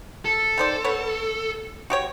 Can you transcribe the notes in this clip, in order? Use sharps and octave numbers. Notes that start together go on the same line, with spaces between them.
A4
D#3 C5 D5
B3 C#5
F#4 G4 C#5